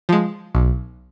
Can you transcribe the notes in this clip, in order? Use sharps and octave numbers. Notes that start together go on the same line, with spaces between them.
F3 G#3
B1